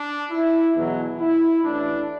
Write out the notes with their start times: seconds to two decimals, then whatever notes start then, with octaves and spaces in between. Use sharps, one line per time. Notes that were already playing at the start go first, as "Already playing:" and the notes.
Already playing: D4
0.31 E4
0.75 E2 B2 F#3
1.20 E4
1.64 A1 A2 E3 D4